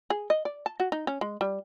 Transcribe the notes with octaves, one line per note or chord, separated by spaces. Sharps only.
G#4
D#5
D5
A5
F#4
D#4
C#4
G#3
G3